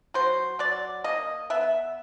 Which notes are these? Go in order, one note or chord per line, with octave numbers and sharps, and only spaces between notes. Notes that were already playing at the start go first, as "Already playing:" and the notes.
F#3 C5
F#3 D5
A#3 D#5
B3 E5